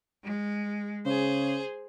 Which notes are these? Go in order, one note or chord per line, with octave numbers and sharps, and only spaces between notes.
G#3
C#3 G#4 C5